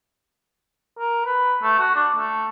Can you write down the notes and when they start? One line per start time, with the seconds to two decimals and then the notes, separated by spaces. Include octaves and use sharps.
0.99 A#4
1.26 B4
1.63 A3
1.79 F#4
1.95 D4
2.17 A3